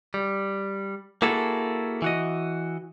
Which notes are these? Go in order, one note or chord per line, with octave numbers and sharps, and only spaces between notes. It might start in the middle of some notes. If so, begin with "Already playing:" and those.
G3
A#3 E4 F#4 G#4 A4
E3 F#4 D#5